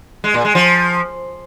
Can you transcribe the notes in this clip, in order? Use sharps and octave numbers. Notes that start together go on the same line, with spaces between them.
G#3
A#2
G#3
F3